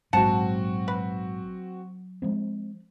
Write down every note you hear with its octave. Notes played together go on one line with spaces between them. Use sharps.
A#1 G#2 F#3 C4 F#4 F#5 A5
B4
F3 G#3 C4